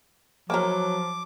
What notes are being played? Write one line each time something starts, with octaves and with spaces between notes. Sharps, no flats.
F3 F#3 A#3 E4 A#4 D6